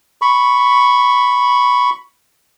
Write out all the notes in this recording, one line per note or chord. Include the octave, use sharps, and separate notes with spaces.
B5 C#6